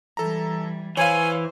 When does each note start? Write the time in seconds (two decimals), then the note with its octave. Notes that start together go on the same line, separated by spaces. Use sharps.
0.17 E3 G3 A4 A#5
0.97 E3 C5 C#5 F5 G#5